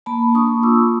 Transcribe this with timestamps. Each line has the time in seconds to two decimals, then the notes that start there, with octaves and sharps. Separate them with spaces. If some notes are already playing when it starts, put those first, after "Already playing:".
0.06 A#3 A5 B5
0.34 D4 C#6 D#6
0.63 F4 D6 E6